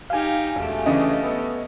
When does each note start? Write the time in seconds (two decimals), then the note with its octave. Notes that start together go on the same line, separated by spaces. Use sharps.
0.10 D#4 G4 F5 G#5
0.56 E1 A3 G4
0.86 C#3 E3 C#4 D4 D#5
1.23 B3 A4